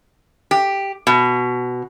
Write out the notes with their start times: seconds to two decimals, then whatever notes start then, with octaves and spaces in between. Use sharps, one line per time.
0.51 G4
1.07 B2